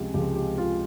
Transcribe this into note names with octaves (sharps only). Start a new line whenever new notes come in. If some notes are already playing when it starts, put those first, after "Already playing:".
Already playing: C#2 C3 F3 G#3 G4
C#2 C3 F3 G#3 G4
G4
F4